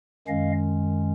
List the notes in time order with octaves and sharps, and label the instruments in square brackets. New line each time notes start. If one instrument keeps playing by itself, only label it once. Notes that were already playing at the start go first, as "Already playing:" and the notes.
[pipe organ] F#2 D#3 G#3 C#4 D#5 F5